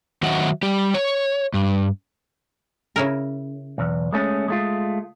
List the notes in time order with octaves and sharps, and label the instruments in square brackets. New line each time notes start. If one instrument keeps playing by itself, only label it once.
[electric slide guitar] D#3 F#3 F#4 D#5 E5 F#5
G3 G4
C#5
G2
[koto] C#3 E4 A#4
[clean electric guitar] B1 E2
G#3 A3 C#4
G#3 A3 F4